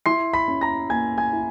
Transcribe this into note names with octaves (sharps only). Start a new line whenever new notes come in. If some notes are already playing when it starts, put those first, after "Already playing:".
E4 C6 C7
B5 B6
C#4
A#5 A#6
A#3 G#5 G#6
G#5 G#6
E4